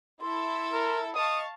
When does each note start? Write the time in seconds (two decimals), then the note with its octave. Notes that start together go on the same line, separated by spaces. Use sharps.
0.21 E4 A4 E5 C6
0.73 A#4
1.15 D#5 F5 A5 C#6 D#6